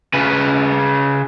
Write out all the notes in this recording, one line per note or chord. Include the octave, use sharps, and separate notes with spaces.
C#3 B4